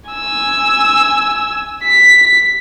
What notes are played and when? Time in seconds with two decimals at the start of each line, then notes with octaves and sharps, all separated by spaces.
0.10 G#5 E6
1.84 B6